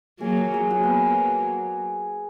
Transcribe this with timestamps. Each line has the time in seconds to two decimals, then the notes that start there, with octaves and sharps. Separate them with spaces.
0.20 F#3 A#3 G#4
0.37 G#4
0.54 G#4
0.71 F#3 A#3 F#4
0.84 B3